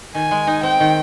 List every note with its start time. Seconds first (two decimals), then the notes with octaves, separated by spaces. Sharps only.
0.15 D#3 G#5
0.31 G#3
0.47 D#4
0.63 C4 G5
0.80 D#3